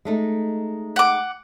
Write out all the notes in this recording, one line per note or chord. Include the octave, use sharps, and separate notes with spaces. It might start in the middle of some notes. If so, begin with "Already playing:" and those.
G#3 A3 D#4
F#5 D6